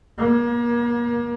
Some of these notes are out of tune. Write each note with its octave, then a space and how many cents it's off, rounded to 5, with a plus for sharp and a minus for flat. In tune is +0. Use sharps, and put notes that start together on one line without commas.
A#3 +35